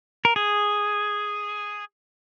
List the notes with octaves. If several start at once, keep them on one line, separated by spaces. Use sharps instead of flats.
A#4
G#4